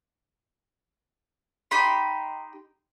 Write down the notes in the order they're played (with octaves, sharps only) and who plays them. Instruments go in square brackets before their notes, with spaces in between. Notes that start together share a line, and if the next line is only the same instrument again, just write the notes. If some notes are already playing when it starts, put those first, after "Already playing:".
[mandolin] D#4 G4 B5 C6